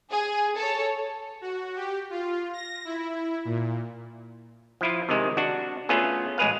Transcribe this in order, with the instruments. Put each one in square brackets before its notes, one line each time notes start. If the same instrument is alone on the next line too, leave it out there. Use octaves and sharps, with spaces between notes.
[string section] G#4
A4 C#5
[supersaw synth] F#4
G4
F4
A#6
E4
A#2
[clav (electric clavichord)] F3 E4 F4
C3 D#3 G#3
D4 F#4
A3 B3 C#4 F4 G#4
A1 G#3 G#4 B4 F5